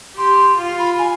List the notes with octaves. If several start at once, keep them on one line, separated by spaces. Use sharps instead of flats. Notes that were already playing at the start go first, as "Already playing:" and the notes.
G4 C6
F4 C6
B5
G#5